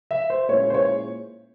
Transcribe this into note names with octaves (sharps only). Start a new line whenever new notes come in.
E5
C5
A#2 G#3 C#4 E4 C#5
C5
C#5